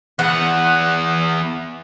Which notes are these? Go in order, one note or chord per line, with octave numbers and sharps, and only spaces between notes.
E2 B3 F#5